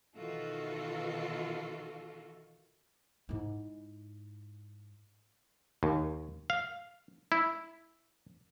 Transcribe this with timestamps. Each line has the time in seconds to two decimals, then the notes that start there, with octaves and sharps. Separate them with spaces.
0.17 B2 D#3 E3 F4 F#4 A4
3.29 G#2 E4
5.83 D#2
6.50 F5
7.32 E4